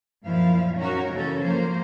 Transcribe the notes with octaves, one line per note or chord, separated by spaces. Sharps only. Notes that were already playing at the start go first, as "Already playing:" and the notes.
F#2 A#2 F3 E4 F5
C#4 D#4 F#4 A#4 C#5
C#3 E3 A#3 C#4 A4
F3 F#3 A#3 C5